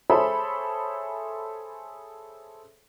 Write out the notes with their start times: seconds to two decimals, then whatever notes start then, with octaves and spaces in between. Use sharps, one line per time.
0.10 G#4 A4 C5 C#5 E5 B5